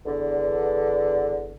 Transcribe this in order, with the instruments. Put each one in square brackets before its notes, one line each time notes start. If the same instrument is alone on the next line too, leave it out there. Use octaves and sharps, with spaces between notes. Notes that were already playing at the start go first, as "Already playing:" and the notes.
[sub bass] F#1 [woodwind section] E2 D3